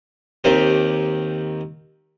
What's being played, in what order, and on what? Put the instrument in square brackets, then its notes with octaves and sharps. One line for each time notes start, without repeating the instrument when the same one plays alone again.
[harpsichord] D#2 D#3 C4 G4